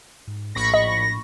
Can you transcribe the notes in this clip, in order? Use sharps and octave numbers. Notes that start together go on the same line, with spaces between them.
G#2
A#1 A2 B5 C#6 A#6
D#5